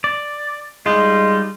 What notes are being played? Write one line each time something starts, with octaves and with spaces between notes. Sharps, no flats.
D5
G3 G#3 D#4 F4